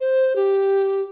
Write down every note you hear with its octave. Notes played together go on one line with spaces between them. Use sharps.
C5
G4